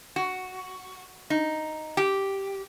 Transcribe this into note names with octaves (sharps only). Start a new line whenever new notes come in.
F#4
D#4
G4